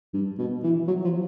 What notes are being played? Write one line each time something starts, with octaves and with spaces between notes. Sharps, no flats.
G2
B2
E3
F#3
F3